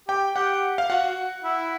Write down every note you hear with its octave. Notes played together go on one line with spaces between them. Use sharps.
G4 G5
G4 F#5
F5
F#4 F#5
E4